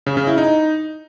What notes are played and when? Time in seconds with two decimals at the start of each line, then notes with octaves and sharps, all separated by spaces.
0.06 C#3
0.17 C#3
0.27 E4
0.38 D#4